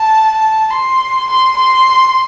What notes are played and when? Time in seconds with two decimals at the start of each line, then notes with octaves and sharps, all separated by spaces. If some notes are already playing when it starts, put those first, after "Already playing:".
Already playing: A5
0.71 C6
1.29 C6
1.56 C6